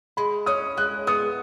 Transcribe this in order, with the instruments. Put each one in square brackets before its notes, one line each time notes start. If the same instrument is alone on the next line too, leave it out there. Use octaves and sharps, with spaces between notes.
[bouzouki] G#3 [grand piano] B5
[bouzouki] C#4 [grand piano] D#6
[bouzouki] G#3 [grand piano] F#6
[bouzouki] B3 [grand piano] D#6